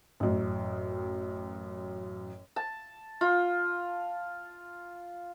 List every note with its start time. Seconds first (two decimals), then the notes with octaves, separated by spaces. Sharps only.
0.20 A1 F#2
2.56 A5
3.21 F4